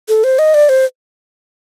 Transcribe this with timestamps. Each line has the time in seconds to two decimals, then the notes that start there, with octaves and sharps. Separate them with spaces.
0.09 A4
0.24 C5
0.39 D#5
0.54 D5
0.69 C5